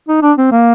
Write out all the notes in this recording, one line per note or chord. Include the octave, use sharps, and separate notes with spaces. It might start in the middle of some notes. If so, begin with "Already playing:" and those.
D#4
D4
C4
A#3